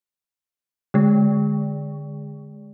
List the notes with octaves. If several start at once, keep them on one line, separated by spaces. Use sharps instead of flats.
D3 G#3